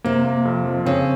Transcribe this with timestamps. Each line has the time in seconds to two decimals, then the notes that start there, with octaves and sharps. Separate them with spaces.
0.04 C3 A#3
0.25 A#3
0.45 F2
0.65 F3
0.86 C#3 C4